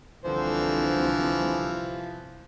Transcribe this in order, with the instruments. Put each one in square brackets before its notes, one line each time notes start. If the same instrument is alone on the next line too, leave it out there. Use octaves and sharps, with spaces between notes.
[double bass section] C2 [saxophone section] D3 C5 [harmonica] E3 F3